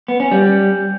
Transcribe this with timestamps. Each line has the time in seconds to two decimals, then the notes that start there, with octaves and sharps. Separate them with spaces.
0.08 B3
0.20 C#4
0.31 G3